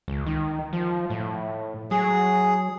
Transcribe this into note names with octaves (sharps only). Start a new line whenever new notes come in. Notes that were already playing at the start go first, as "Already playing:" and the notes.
C#2
D#3
F3
A2
F#3 G#4